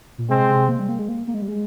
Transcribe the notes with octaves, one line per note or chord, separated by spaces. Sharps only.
A#2
C3 G#3 C4
C3
A#3
G3
A#3
G#3
A#3
A#3
G#3
G3
G#3